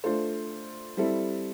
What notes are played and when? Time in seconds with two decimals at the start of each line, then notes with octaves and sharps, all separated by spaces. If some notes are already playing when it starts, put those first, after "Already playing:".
0.04 A3 D4 F4 A4 C5
0.97 G3 C4 E4 A4